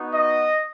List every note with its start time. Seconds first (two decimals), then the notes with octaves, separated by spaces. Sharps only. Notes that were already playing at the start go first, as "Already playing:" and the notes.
Already playing: B3 D#4 F#4
0.14 D#5